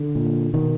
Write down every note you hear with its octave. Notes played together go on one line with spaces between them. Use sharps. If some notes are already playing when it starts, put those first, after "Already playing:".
Already playing: D3
A#2
B2 D#3